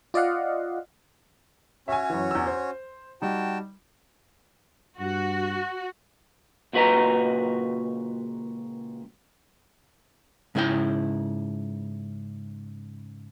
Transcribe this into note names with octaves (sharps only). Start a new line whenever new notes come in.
F4 D5 D#5 F5 F#5
C#4 F#4 C#5 E5 G#5
F#2 E3
E2 E6
C5
G3 D#4 F#4 G5 A5
G2 F#4
C#2 A#2 F#4 B4 D#5 A#5
G#2 C#3 E4 B4 G5